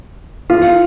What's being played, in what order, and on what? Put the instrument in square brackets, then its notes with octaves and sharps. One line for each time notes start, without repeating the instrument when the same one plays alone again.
[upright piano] F4